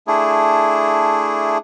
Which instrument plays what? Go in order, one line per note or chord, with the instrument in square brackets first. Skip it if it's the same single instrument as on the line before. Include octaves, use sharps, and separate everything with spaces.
[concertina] A3 D4 E4 G#4